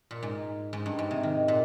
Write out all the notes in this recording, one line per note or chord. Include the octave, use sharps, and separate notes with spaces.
A#2
G#2
G#2
G2
G#2
C3
D#3
A#2